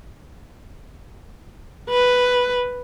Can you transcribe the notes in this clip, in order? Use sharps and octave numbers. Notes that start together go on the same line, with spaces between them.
B4